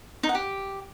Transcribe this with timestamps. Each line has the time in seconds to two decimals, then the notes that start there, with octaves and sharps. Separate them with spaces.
0.23 D#4
0.29 F#5
0.35 G4